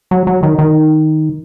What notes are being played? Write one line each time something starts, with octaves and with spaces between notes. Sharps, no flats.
F#3
F#3
D#3
D#3